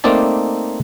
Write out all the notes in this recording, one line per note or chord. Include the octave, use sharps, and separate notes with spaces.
A3 A#3 C4 D#4 D5 A5